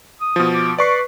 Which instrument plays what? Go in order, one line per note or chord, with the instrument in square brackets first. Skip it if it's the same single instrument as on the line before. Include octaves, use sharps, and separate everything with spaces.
[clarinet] D#6
[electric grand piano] B2 F3
[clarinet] D6
[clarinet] B4 [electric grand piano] D5 C#6 C7